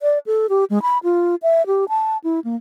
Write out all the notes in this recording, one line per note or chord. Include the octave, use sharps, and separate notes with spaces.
D5
A4
G4
G#3
B5
F4
E5
G4
A5
E4
A#3